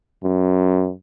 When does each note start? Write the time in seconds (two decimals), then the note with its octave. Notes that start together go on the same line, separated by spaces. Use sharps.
0.24 F#2